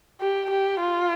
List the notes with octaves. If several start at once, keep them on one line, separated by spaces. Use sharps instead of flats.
G4
G4
F4